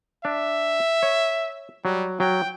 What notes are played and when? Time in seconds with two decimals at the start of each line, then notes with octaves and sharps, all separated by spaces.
0.25 D4 E5
1.03 C#5
1.85 F#3 G3
2.20 F#3 G5